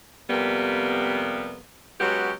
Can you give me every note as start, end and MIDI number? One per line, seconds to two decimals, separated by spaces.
0.30 1.58 41
0.30 1.58 48
0.30 1.58 55
0.30 1.58 58
0.30 1.58 59
2.00 2.32 54
2.00 2.32 56
2.00 2.32 59
2.00 2.32 61
2.00 2.32 66
2.00 2.32 67